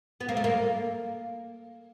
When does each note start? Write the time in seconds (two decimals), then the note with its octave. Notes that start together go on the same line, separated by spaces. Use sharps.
0.20 B3
0.29 A#3
0.37 A3
0.44 A#3